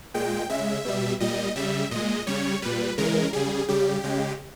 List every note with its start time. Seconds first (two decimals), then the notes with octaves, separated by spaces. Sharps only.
0.14 A#2 G#3 G5
0.50 C#3 G#3 E5
0.85 B2 G3
1.20 A#2 G3 D#5
1.55 C#3 G3 E5
1.91 A#2 G#3 D#5
2.27 C#3 G3 C#5
2.62 A#2 G3 B4
2.98 C#3 E3 G#3 A#4
3.33 C#3 G3 G#4
3.68 C#3 G3 G4
4.04 C#3 G#3